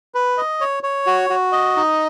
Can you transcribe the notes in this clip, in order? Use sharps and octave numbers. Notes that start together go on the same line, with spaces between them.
B4
D#5
C#5
C#5
F#4
F#4
D#5
D#4